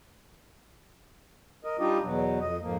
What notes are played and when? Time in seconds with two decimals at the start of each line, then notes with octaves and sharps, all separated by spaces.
1.64 A#4 D#5
1.79 G3 D4 D#4 F4 G4 D#5
2.03 E2 B2 F#3
2.41 F2 D#5
2.62 F2 G#2 F3 A#3